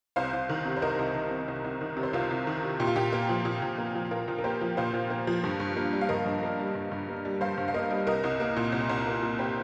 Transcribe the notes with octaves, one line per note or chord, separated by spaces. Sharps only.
C2 C5 F5
C2
D#3
C3
C5
C2 A#4 D#5
C2
D#3
C3
C2
C2
D#3
C3
C5
C2 F4 A#4
C2
D#3
C3
A#2 G4
F4
A#2 G4
A#3
F3
A#2
A#2
A#3
F3
A#2 F4 A#4
A#2
A#4
A#3 G4 C5
F3
A#2 C5 F5
A#2
A#3
F3
G2
G2
A#3
G3
F5
G2 A#4 D#5
G2
A#3
G3
G2
G2
A#3
G3
G2 C5 F5
G2
F5
A#3 A#4 D#5
G3
C2 A#4 D#5
C2
A#3
A#2
C2
C2
A#3
A#2
G4 C5